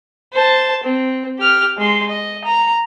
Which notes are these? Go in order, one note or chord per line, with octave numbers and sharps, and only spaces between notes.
C5 A5
C4
G4 F6
G#3 C6
D#5
A#5